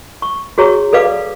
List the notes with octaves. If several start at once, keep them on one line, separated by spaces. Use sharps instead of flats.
C#6
F#4 G#4 C#5 A#5 C#6
A4 B4 D5 F5 D6